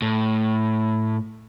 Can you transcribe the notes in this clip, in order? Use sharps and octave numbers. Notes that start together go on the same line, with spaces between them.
A2